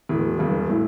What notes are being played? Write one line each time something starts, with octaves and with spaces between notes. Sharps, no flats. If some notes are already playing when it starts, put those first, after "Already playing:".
E1 A2
E1 G2
A2